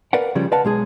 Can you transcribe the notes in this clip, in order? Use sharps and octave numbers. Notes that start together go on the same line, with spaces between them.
A#4 B4 D5 F5 F#5
C#3 F3 G3
B4 D5 D#5 F5 F#5 A5
B1 G#3 G#4